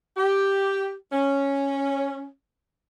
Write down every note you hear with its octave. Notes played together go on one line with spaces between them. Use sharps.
G4
C#4